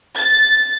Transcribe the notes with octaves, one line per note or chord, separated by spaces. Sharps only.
A6